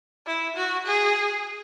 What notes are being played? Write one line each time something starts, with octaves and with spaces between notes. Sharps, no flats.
E4
F#4
G#4